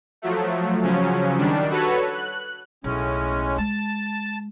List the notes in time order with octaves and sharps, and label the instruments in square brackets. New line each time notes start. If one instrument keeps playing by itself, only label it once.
[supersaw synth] F3 F#3 A3
C#3 F3 F#3 C#4
D#3 G3 D4
F#4 A4 B4 C#5
F#6
[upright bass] B1 [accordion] A2 G#3 C#4
[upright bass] G#3 [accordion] A5